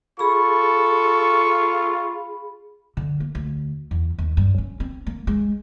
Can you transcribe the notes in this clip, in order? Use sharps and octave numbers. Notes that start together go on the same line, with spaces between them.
F4 G#4 A4 B5 C#6
D3
A#3
D2
E2
D#2
G2
C#4
C4
A#3
G#3